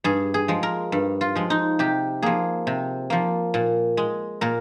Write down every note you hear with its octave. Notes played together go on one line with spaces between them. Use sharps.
G2 G#4
G#4
F3 G#3
A#4
G2
F4
F3 G#3
D#4
C3 G4
F3 A#3 G#4
C3
F3 A#3
A#2
G#3
A#2 A#4